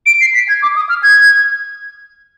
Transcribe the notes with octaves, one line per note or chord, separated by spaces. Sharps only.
D7
C7
B6
G#6
D6
D#6
F6
G#6